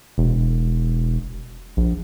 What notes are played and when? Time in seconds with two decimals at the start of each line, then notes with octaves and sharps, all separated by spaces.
0.18 E1
1.77 A#1